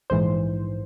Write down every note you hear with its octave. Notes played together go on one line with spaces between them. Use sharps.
A#1 G#2 E3 C5